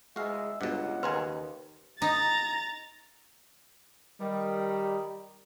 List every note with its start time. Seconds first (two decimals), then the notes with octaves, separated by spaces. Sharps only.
0.16 G#3 F#4 E5 F5
0.61 C#2 G2 B2 F#5
1.03 D#2 C#3 A#4 B4 G#5 C6
2.02 D#4 A#5 A6
4.21 D#3 G3